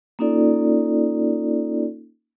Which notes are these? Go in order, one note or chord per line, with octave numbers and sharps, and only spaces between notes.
A#3 C#4 D#4 F4 A4 D5